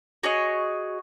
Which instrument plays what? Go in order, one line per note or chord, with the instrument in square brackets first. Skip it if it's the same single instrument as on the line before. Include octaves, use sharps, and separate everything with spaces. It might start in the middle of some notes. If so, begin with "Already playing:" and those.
[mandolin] F#4 G#4 C#5 D#5